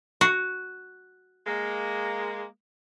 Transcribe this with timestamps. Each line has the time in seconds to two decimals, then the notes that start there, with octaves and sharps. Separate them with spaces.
0.21 F#4
1.46 G#3 A#3